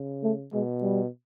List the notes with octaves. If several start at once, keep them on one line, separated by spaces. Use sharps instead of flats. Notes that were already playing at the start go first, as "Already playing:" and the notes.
Already playing: C#3
A3
B2 G#3
G3